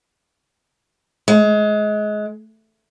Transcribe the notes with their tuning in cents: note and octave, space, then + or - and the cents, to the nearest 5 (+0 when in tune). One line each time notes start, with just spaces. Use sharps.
G#3 +25